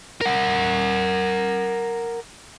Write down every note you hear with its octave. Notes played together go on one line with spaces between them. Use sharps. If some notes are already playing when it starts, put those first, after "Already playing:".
A#4 F#5